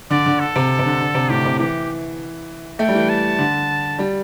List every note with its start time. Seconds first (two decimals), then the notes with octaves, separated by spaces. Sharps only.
0.10 D3 D5
0.26 D3
0.40 A4
0.56 C3
0.79 C3
0.85 D3
1.00 D3
1.14 C3
1.30 A2 G4
1.45 C3
1.59 E3 G4
2.79 A3 G5
2.88 G3
2.95 E3
3.09 A5
3.39 D3
3.99 G3